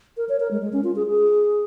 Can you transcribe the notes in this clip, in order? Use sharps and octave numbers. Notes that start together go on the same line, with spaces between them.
A#4
C#5
A#4
G#3
G#3
C#4
F4
G#4
G#4